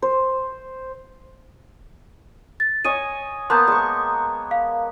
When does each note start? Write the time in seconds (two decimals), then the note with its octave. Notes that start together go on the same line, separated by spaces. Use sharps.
0.02 C5
2.60 A6
2.85 C#5 D#5 G#5 D#7
3.50 A#3 B3 A5 C6 G6
3.67 G#3 C#6
4.51 F5